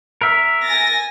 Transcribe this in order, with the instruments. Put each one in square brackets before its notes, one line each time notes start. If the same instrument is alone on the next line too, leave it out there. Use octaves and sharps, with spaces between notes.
[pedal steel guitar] A#4 E5
[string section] G#5 A6 A#6